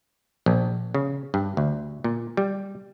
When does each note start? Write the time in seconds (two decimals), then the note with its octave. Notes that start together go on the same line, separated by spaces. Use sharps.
0.46 A#1
0.94 C#3
1.34 G2
1.57 D2
2.04 A#2
2.37 G3